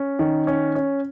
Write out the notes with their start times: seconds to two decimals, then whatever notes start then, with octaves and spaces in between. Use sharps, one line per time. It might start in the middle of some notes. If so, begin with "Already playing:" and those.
Already playing: C#4
0.19 D#3
0.47 C#4
0.75 C#4